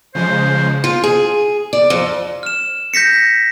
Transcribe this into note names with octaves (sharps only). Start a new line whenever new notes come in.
C#3 F3 G#3 C5
F4
G#4
D5
F2
F6 E7
G6 A#6 B6 C#7